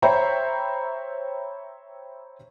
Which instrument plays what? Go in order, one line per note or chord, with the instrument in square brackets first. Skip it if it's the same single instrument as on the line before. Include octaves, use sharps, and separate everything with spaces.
[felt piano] C5 C#5 E5 G5 A#5 B5